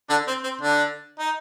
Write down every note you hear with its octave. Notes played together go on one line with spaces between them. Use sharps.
D3 D4
C4
C4
D3 D4
D#4